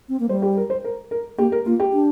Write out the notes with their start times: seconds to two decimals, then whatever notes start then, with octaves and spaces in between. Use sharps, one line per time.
0.09 C4
0.20 A#3
0.29 G3 C5
0.42 G4
0.57 A#4
0.70 C5
0.84 A#4
1.11 A#4
1.38 A#3 G4
1.52 A#4
1.66 A#3 F4
1.80 G4
1.93 D4